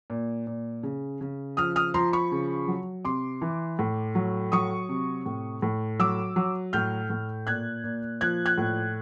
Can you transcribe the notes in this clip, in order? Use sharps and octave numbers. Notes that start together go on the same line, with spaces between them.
A#2
A#2
C#3
C#3
F3 D#6 F6
D#6 F6
F3 A#5 C6
B5 C#6
C#3
F#3
C3 C6 D6
E3
A2
F#3
F#3 C#6 D#6
C3
A2
A2
F#3 D6 E6
F#3
A2 F6 G6
A2
A#2 F#6 G#6
A#2
F3 F#6 G#6
F#6 G#6
A2